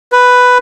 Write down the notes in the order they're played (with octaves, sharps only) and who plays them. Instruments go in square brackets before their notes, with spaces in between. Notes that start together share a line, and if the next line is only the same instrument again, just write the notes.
[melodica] B4